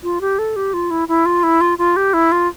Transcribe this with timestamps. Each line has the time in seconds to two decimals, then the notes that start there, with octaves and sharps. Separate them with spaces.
0.03 F4
0.21 G4
0.39 A4
0.56 G4
0.74 F4
0.91 E4
1.08 E4
1.26 F4
1.43 E4
1.61 F4
1.78 F4
1.96 G4
2.14 E4
2.32 F4